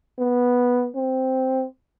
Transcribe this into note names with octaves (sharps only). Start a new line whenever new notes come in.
B3
C4